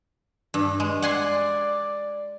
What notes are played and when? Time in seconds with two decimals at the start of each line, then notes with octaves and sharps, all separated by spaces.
0.54 G2
0.80 G#3
1.02 D5 F#5 G#5 C6